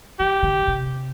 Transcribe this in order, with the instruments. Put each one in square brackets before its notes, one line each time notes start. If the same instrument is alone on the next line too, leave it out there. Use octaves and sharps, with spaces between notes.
[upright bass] E3 [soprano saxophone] G4
[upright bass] D3
C3